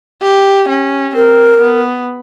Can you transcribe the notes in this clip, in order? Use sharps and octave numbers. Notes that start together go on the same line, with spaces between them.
G4
C#4
C4 A#4
B3